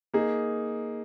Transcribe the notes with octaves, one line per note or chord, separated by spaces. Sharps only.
A#3 D#4 G#4